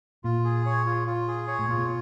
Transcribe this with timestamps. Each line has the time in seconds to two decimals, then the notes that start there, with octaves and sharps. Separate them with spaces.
0.24 A#2 F4
0.44 G#4
0.66 C#5
0.86 F4
1.07 F4
1.28 G#4
1.48 C#5
1.59 A2
1.68 A#2 F4
1.79 B2